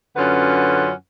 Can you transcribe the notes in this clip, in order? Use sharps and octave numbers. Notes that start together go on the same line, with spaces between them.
F#2 D3 C#4 F4 B4 F#5